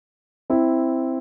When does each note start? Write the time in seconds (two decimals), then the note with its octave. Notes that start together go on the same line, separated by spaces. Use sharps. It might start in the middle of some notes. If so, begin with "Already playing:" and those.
0.50 C4 E4